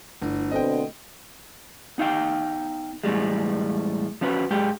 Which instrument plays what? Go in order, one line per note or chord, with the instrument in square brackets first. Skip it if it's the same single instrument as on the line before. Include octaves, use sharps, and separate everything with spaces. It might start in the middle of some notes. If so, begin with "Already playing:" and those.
[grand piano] G1 [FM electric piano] A3 D4 E4
[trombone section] B2 D3 C4 [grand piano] D#5 G5
[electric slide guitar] B3 D#4 F5 G5
E2 A2 G3 G#3
F3 C#4 F#4 B4
G#2 G#3 G4